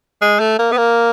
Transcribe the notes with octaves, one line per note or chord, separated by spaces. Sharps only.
G#3
A3
A#3
B3
A#3